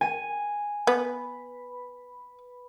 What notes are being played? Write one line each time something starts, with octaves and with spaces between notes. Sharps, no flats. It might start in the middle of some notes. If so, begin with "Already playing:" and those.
G#5
B3 B4 B5